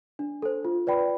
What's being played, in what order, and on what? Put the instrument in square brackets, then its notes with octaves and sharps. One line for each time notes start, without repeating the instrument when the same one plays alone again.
[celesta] D4
A4 C5
F4
B4 D5 G5 B5